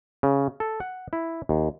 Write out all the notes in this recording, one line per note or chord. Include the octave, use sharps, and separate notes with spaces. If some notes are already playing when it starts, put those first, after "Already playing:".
C#3
A4
F#5
E4
D#2